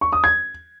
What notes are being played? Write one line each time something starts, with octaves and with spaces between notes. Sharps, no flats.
C#6
D#6
G#6